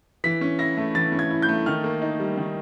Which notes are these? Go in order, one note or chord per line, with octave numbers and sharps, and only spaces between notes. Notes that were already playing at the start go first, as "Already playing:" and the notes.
E3 B6
C#4
E4 A#6
A3
E3 A6
C#4
G#6
E4
G6
A3
D#3 F6
A#3
D#4
G3
D#3